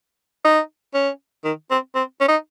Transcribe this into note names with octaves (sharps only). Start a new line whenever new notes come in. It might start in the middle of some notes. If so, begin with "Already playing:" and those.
D#4
C#4
D#3
C4
C4
C#4
D#4